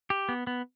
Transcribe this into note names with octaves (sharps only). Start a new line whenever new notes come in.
G4
B3
B3